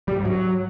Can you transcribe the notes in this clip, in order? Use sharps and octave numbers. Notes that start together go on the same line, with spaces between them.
G3
G#2
F#3